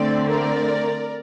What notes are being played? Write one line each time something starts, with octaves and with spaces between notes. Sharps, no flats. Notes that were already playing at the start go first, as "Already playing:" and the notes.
Already playing: D3 A3 C4 D5
A#4 D5